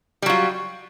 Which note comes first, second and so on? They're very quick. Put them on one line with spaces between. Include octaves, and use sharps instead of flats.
G3 F#3 F4